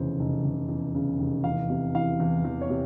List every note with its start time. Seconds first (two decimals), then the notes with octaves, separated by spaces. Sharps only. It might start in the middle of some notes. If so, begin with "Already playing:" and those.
Already playing: F1 E2 C#3 C5
0.19 F1
0.44 F1
0.69 E2
0.95 C#3
1.19 F1
1.44 E2 F5
1.70 C3
1.95 E3 F5
2.20 E2
2.44 E2
2.61 C#5
2.70 C3